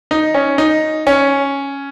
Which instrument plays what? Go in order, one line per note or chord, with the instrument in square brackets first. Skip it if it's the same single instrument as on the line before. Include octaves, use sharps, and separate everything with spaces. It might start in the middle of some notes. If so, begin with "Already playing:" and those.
[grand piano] D#4
C#4
D#4
C#4